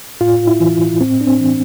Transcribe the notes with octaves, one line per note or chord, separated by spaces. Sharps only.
A2 F4
E4
E3
A2 C4
D4
C4
E3